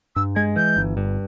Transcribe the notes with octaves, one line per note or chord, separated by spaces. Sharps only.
G2 E6
G#3 G#6
E3 G6
G1
G2